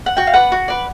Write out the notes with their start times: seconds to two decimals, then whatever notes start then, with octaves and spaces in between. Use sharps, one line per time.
0.06 F#5
0.17 F#4 G5
0.27 F5
0.34 B4 D5 F#5
0.52 F#4
0.68 B4 D5